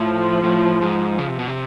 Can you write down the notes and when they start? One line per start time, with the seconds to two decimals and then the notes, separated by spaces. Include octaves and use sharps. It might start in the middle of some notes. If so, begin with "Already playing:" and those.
Already playing: A2 F3
0.44 A2
0.82 G#2
1.18 C#3
1.28 C3
1.39 B2
1.48 C3